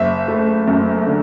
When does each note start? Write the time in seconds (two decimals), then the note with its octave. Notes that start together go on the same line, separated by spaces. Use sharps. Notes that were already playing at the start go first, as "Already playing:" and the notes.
Already playing: F#1 E5
0.28 A3
0.68 F#2
1.07 D3